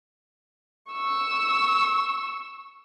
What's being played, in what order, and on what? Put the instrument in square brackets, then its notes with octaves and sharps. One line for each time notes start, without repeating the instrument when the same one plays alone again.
[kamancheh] C#6 E6